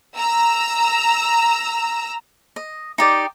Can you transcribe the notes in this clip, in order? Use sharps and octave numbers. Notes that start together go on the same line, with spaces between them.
A#5 E6
D#5
D#4 G4 D5